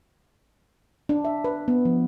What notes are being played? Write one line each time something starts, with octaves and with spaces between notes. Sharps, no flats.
D4
E5
B4
B3
F3